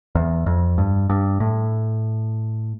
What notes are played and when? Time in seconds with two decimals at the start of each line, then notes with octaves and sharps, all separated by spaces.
0.15 E2
0.46 F2
0.78 G2
1.10 G2
1.40 A2